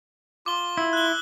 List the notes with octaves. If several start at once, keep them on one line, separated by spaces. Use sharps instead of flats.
F4 D6 G7
E4 E6
F#6 G7